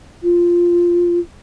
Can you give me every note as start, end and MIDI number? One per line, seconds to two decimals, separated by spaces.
0.23 1.19 65